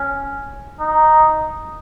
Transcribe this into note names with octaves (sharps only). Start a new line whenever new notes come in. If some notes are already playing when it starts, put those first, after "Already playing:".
Already playing: C#4
D#4